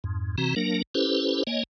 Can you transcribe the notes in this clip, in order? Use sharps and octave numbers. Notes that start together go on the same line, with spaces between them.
F2 G#2
C3 E3 C4 F#4 A#5
F#3 A#3 D4 A#4
C#4 E4 G4 A4 B4 C5
A#3 C#5 D#5 G#5